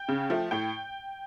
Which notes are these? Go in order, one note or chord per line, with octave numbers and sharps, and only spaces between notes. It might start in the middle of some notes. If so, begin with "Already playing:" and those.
Already playing: G5
C#3
F3 A3
A2 G5